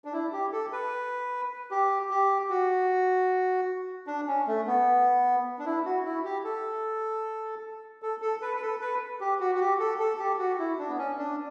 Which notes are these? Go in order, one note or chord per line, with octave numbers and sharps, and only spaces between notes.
D4
E4
G4
A4
B4
G4
G4
F#4
D4
C#4
A3
B3
D4
E4
F#4
E4
G4
A4
A4
A4
B4
B4
A4
B4
G4
F#4
F#4
G4
A4
A4
G4
F#4
E4
D4
B3
C#4
D4